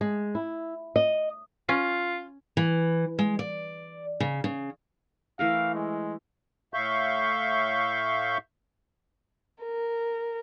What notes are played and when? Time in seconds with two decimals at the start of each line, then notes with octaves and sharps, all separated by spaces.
0.01 G#3
0.35 E4
0.96 D#5
1.69 C#4 F4
2.57 E3
3.19 G#3
3.39 D5
4.20 C#3
4.44 C#3
5.39 E3 A3 A#4 F5
5.74 G#3
6.74 A2 E5 F5 C#6 G6
9.64 A#4